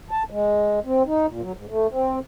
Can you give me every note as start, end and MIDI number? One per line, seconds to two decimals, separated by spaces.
0.11 0.23 81
0.30 0.80 56
0.85 1.03 60
1.06 1.26 63
1.28 1.41 46
1.42 1.52 54
1.56 1.65 44
1.69 1.87 57
1.91 2.19 60